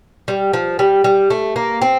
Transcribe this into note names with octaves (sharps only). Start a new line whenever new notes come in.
G3
F3
G3
G3
A3
A#3
C4